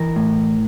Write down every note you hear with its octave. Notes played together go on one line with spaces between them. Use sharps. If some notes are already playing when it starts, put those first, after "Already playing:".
Already playing: E3 A#4
A2